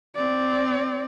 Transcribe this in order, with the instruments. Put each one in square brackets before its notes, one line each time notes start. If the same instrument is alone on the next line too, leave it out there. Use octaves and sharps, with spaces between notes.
[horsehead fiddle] C4 D5